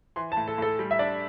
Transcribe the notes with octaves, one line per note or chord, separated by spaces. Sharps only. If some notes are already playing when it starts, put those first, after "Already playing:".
E3 C6
A5
A2
A4
A2 A4
G3
E5
D4 D5